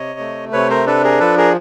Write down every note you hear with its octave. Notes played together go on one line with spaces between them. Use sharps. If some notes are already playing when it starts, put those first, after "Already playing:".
Already playing: C3 C#5 D#5
A3
C3 B4 C#5
A#4 C5
D4 A4 B4
G#4 A#4
F3 A4 B4
G#4 A#4